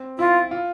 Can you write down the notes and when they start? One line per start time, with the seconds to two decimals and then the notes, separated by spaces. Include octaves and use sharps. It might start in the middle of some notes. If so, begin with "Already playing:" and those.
Already playing: C4
0.19 E4 F4
0.51 F4